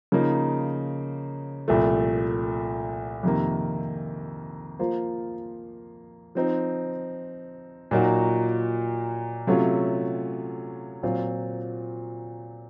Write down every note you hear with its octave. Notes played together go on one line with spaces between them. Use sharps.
C#3 F3 A#3 D#4
C2 A#2 F3 A3
F2 C3 D#3 A#3
F3 A#3 F4 C5
F3 C4 D#4
A#2 F#3 A#3 D#4 F#4
C3 F#3 A3 C#4 F4
A#2 F#3 C4 F4